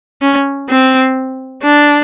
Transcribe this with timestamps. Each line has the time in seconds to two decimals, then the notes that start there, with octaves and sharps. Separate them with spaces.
0.22 C#4
0.69 C4
1.63 D4